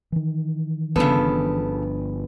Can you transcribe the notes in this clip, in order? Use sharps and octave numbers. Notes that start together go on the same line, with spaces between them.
D#3 E3
G1 C#3 F3 B3 D4 A4